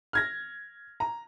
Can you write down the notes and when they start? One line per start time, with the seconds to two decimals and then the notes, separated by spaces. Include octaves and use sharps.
0.13 F6 G#6 A#6
1.00 A#5